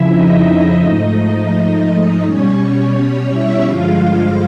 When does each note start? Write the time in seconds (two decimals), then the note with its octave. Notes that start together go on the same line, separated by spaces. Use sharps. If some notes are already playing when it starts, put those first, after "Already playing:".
Already playing: F2 C#3 F3 E4 E5
0.10 D#4 D#5
0.81 G#2 F3 A3
2.23 B2 G3 C#4 C#5
2.95 C#4 C#5
3.31 E4 E5
3.67 G2 D3 F3 G#3 F4 F5